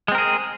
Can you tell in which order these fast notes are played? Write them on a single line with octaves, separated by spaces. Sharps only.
G#3 C4 A#4 G#4